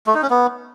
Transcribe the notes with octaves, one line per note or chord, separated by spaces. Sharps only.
A3
D#4
C#4
B3